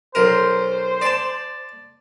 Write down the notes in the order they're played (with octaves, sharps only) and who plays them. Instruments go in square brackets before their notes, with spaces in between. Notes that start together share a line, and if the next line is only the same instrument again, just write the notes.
[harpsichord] B1 A#4 [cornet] C5
[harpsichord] D5 A5